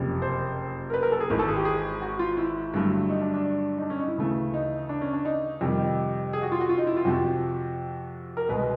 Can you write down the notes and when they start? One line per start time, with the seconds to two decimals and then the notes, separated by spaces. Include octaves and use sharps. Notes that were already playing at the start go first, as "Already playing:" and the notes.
Already playing: F#1 F2 C3
0.22 C5
0.90 A#4
0.94 B4
1.03 A#4
1.12 A4
1.20 G#4
1.29 G#1 G#2 E3 A#4
1.39 A4
1.48 G#4
1.56 G4
1.65 G#4
2.02 F#4
2.19 F4
2.37 E4
2.74 G2 D3 F#3 A3
3.09 D#4
3.21 D4
3.34 D4
3.78 D#4
3.82 D4
3.90 C#4
3.99 D#4
4.08 E4
4.18 D2 C#3 E3 A3
4.54 D#4
4.89 D4
5.01 C#4
5.13 D4
5.25 D#4
5.61 F2 C3 D#3 G3
6.33 G#4
6.42 F#4
6.52 F4
6.60 F#4
6.69 F4
6.78 D#4
6.87 E4
6.97 F4
7.05 F2 C3 F3 F#4
8.37 A#4
8.49 C2 B2 G#3 B4